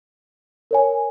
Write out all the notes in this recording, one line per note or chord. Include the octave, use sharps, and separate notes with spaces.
A#4 C#5 G#5